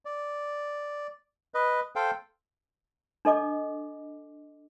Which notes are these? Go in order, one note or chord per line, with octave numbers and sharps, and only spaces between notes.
D5
B4 D#5
A4 C5 F5 G5
D4 A4 D#5 D6